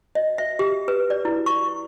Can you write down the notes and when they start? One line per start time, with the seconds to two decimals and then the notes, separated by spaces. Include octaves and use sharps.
0.15 D#5
0.38 E5
0.59 G4
0.88 B4
1.10 D5
1.25 E4
1.46 C#6